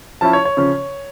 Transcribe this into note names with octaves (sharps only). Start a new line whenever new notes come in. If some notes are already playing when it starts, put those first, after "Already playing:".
F3 C#4 E4 A5
C#5
C#5
C#3 F3 C#4